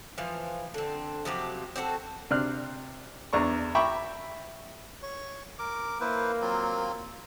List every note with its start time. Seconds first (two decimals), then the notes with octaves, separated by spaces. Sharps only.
0.18 E3 F3 F5
0.74 D3 C4
1.25 C3 F3 F#3 G4
1.76 C4 D4 F#4 A4
2.31 C3 D4 C5 F6 F#6
3.33 E2 D4 A#5 C#6
3.75 E5 G5 A#5 B5 C#6 D6
5.02 C#5
5.59 A#4 D6
6.00 A#3 E4 B4 C5
6.42 F#3 C4 F4